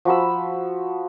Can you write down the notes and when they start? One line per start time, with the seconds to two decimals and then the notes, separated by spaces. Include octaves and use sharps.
0.05 F3 F#4 B5 E6